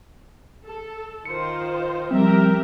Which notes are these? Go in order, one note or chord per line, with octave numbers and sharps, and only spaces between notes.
A4
D#3 F4 C5 C#7
F3 G3 C4 G4 A#4 E5